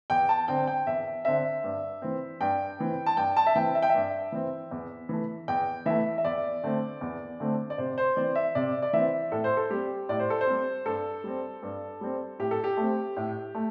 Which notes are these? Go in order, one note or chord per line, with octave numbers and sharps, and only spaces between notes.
E2 G5
A5
D3 C4 G5
G5
E2 E5
D3 C4 E5
G2
E3 C4
G2 G5
E3 C4
A5
G2 G5
A5
E5
E3 C4 G5
E5
G5
G2 E5
E3 C4
E2
E3 A3
E2 G5
E3 A3 E5
E5
E2 D5
D3 A3 C4
E2
D3 A3 C4
D5
C3 C5
C5
E3 C4 D5
E5
C3 D5
D5
E3 C4 E5
A2 A4
C5
A4
G3 C4 G4
A2 D5
C5
A4
C5
G3 C4
G2 A4
G3 C4
G2
G3 C4
A2 G4
A4
G4
A3 C4
A2
A3